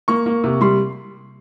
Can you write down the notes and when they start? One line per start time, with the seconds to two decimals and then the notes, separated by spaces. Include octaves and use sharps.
0.08 A#3 C#6
0.26 A#3
0.44 C3
0.61 G3 C6